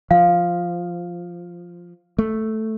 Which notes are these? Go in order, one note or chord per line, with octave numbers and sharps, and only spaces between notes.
F3 F5
A3